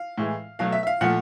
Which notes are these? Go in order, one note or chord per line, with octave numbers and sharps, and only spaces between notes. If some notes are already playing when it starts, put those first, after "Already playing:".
Already playing: F5
A2 E3 G#3
B2 F#3 A3 F5
E5
E5
F5
A#2 F3 A3 F#5